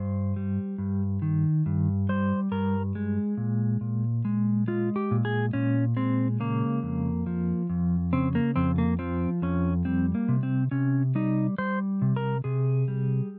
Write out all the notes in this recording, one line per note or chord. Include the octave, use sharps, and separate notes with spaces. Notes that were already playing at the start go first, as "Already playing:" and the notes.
Already playing: G2 C5
G3
G2
D#3
G2
G3 C5
G2 A#4
G#3
A#2
A#2
G#3
G#3 F4
G4
A#2
G#4
A#2 C#4
G#3 C4
C#3 A#3
F2
F3
F2
C#3 C4
A#3
F2 C4
A#3
F3 C4
F2 C#4
G3 C4
A#3
C3
C4
C3 C#4
G3 D#4
G3 C5
C3
A#4
C3 G#4
G3